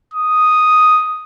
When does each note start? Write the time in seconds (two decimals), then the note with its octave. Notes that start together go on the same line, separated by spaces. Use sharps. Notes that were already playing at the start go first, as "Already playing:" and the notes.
0.14 D#6